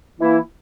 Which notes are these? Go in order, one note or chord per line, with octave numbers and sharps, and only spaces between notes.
E3 A#3 E4